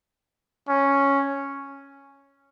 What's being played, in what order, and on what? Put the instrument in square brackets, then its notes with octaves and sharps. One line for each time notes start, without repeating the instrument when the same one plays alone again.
[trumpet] C#4